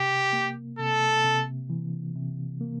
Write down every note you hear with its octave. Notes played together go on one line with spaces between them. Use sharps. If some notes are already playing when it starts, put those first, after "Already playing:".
Already playing: C3 G4
A#3
C3 A4
C3
E3
C3
A#3